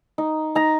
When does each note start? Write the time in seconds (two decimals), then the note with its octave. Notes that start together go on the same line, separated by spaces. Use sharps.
0.18 D#4
0.55 D#4 A#5